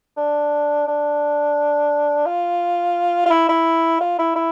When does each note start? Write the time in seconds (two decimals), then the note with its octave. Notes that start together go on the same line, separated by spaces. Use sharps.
0.17 D4
0.88 D4
2.26 F4
3.26 F4
3.31 E4
3.49 E4
4.01 F4
4.19 E4
4.36 E4